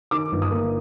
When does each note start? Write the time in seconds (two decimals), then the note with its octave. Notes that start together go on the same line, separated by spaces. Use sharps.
0.11 D#3 D6
0.32 G1
0.42 D#6
0.51 A#3